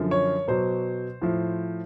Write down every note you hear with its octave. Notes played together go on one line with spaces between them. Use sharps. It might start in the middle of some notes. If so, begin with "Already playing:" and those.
Already playing: F#2 D3 F3
C#5
B2 F#3 C5
A2 F3